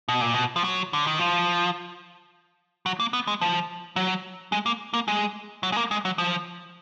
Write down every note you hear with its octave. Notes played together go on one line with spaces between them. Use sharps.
B2
A#2
B2
F3
F#3
D3
D#3
F3
F#3
A#3
B3
G#3
F3
F#3
G#3
A#3
A#3
G#3
F#3
G#3
A#3
G#3
F#3
F3